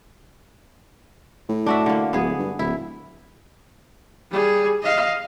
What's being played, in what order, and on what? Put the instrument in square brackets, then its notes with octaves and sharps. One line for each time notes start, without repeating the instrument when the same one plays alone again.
[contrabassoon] A2
[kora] D4 F#4 E5
D3 A#3
[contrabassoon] D1 [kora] B3 G#4
[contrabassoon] G2
[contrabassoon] D1 [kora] E4
[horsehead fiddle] G3 G#4
D#5 F5